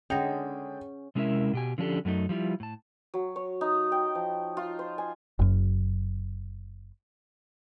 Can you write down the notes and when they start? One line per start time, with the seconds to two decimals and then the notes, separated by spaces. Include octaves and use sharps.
0.10 D3 G#3 C#4 G#4 F#5 G5 A#6
1.15 C3 G#3 C#4 E4 A#4 E5
1.53 B2 G4 G#5
1.78 D3 F3 C#4 D4 G4 A4
2.05 F#2 F#3 A3 D#4
2.29 F3 G3 E4 F4
2.60 A2 A5
3.14 F#3
3.36 C#5
3.61 D#4
3.92 G5
4.15 F3
4.57 F4
4.79 C5
4.98 G#5
5.39 F#1 F#2